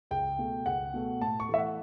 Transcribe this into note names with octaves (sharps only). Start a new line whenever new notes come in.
C#2 G5
B2 A3
C#2 F#5
B2 A3
A2 A5
C#6
E3 A3 E5
F#5